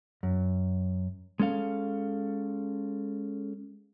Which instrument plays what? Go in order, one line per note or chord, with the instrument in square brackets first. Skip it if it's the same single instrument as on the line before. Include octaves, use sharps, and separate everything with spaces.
[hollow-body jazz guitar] F#2
[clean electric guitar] G#3 C#4 A4 F5